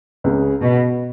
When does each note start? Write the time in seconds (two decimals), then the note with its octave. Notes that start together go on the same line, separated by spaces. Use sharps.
0.24 C#2 C#3 G#3 C#4
0.62 B2